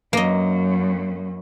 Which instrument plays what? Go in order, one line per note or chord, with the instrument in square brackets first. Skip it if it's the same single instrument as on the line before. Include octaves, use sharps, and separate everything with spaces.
[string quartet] F#2 [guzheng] A#3 D#5